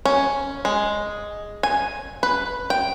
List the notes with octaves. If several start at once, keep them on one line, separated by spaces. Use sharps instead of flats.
C#4
G#3
G#5
B4
G5